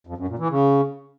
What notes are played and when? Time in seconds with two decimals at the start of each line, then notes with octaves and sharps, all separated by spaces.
0.07 F2
0.18 F#2
0.28 A#2
0.39 E3
0.49 C#3